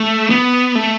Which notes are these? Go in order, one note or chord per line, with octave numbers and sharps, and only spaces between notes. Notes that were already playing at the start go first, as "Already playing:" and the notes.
Already playing: A3
B3
A3